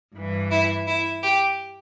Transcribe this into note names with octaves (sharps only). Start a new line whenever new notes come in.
G2 E3
E4
E4
G4